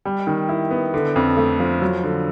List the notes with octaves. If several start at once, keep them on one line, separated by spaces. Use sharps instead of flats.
G3
D#3
E4
B3
D3
F2
A3
F3
F#3
D3